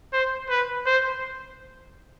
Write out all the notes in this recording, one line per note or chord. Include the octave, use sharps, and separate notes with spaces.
C5
B4
C5